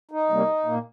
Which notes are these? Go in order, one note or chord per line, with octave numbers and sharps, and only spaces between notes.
D#4
C3 G3 A#3
A#2 A#3